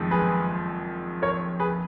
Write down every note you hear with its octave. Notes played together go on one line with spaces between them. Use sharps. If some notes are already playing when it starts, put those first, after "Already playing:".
Already playing: F#1 F2 D#3 G#3
G#4 B4
A#4 C#5
G#4 B4